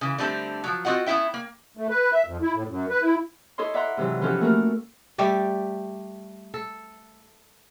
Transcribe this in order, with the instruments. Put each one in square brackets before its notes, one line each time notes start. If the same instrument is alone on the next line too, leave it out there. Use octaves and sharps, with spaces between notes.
[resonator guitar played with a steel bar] C#3 E3
D3 G3 A3 C4 D4
F3 F#3
C4 F4 F#4 D#5 F#5
B3 C#4 E4 E5 G5
A#3
[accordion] A3
B4
E5
F2
E4
A2
F#2
B4
E4
[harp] E4 A4 C#5 D#5 C6
D5 E5 F#5 A#5 C6
G#2 C3 E3 F#3
E3 F3 C#4 G4 A4 F#5
A3 A#3 F#4 A4 A#4
[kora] G3 A3 G4 D5
A4